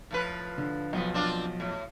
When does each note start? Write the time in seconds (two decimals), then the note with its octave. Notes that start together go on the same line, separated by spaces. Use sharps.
0.11 A2 F3 B4
0.58 D3
0.93 B1 F3 B3
1.14 C4 D4 F4
1.60 A2